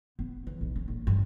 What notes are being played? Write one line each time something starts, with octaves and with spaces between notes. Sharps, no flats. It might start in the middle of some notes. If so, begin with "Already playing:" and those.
B3
E3
B1
C#4
A#1
G2